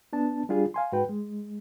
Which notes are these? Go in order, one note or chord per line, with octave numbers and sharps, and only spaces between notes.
B3 D4 A5
G3 D4 F4 G#4
F5 G#5 C6
G#2 F#4 B4 G5
G#3